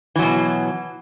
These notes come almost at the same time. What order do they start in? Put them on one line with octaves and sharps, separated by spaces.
E3 F#3 B2